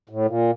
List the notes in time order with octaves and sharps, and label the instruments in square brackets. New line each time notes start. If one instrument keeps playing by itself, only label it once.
[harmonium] A2
A#2